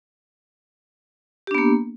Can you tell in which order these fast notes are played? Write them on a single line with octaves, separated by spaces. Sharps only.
G4 D4 B3 A#3